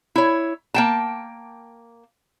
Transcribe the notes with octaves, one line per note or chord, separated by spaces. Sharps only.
E4 C#5
A#3 G5 A5